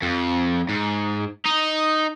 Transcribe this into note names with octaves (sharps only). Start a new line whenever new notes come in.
F2
G#2
D#4